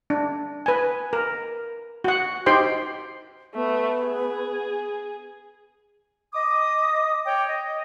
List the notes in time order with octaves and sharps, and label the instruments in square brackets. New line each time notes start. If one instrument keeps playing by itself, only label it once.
[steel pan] D4
B4 G#5
A#4
F#4 F#5
D#4 G4 C5 G5 C6
[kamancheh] A3 [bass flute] B3
[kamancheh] G#4
[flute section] D#5 D6 D#6
C#5 G5 D6
D#5